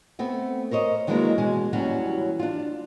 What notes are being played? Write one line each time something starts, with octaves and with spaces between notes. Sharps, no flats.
A3 B3 C4
A#4 C5 C#5 D#5
D#3 E3 F#3 G#3 A#3 D4
B2 G#3 G#5
D#2 E3 F#3 G3 C#4
D4 F4